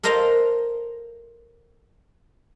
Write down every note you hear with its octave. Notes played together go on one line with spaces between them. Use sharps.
A4 A#4 C5 D#5 F5 A#5